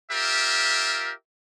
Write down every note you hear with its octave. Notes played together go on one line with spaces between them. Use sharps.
F4 G4 A#4 E5